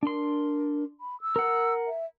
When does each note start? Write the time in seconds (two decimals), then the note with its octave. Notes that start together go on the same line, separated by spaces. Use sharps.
0.03 D4 A#4 C6
1.01 B5
1.21 E6
1.36 A#4 F#5
1.87 E5